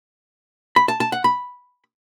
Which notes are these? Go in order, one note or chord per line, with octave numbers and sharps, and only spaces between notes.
B5
A5
A5
F#5
B5